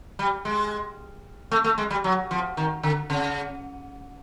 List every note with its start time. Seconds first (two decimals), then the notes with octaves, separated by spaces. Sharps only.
0.19 G3
0.45 G#3
1.51 A3
1.64 A3
1.78 G#3
1.91 G3
2.04 F#3
2.31 F3
2.57 D#3
2.83 D3
3.10 C#3